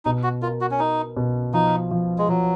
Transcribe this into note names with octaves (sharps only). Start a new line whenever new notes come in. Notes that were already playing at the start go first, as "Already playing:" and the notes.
B2 D#4
F#4
F4 A#4
F#4
C#4
D#4 A#4
B2
F3 D#4
F3
G#3
F3 F#3